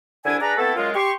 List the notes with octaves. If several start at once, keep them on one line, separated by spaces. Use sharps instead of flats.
C2 D3 D4 E4 G#5
D4 G#4 B4 F#5 A#5
A3 B3 C4 E4 A4
F#2 G#3 F4
G4 C6 C#6